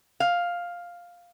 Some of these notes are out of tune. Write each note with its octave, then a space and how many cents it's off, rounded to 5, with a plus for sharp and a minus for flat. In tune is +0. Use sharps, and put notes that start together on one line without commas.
F5 +5